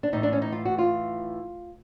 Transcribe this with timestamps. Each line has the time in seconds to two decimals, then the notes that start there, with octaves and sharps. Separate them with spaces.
0.03 D4
0.13 A2 E3 D#4
0.23 D4
0.33 C#4
0.42 D#4
0.52 F4
0.65 F#4
0.78 F4